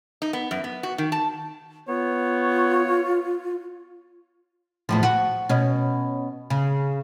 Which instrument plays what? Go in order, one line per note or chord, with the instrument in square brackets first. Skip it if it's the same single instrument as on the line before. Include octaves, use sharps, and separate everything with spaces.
[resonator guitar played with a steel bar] D#4
B3
F#2
B3
F#4
D#3
A5
[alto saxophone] B3 [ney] F4 [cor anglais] C#5
[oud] E2 A2 F3
F#4
B2 C#4
C#3